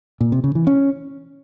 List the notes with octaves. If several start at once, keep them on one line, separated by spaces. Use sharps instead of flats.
A#2
C3
C#3
E3
C#4